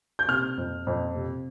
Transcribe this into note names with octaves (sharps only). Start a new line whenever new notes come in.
G6
C3 F6
F2
F2
C3